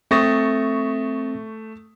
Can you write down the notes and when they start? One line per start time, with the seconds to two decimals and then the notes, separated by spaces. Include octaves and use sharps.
0.11 A3 C4 C#6 D#6 A6 A#6